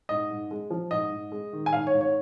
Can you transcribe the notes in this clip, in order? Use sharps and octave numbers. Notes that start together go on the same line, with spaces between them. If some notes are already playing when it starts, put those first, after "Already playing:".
G#2 D#5
G#2
G#3
F3
G#2 D#5
G#2
G#3
D#3
G#5
G#2 F5
C#5
G#2
C#5